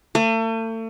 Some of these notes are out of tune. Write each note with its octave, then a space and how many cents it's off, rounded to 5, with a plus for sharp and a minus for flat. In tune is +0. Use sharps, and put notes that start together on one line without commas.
A3 +40